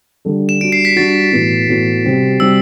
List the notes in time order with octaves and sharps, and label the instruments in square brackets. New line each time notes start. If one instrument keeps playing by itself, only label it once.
[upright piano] D3 G3 D4 A4
[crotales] E7
[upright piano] G3 D4 F#4 [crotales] D7
[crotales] C7
B6
[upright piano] G3 D4 F#4 [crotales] A6
[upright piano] A2 E3 B3 F#4
A2 E3 B3 F#4
C3 G3 C4 F#4
[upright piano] C3 G3 C4 F#4 [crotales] E6